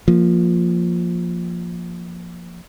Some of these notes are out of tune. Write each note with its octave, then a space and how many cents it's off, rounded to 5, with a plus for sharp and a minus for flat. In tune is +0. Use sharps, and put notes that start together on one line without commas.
F3 +0 A#3 +0